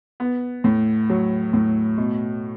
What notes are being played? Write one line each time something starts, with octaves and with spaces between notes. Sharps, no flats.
B3
A2
F#3
A2
B2